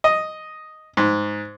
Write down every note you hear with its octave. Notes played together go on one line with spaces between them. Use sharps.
D#5
G#2